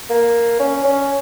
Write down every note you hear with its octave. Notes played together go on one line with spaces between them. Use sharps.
A#3
C#4
C#4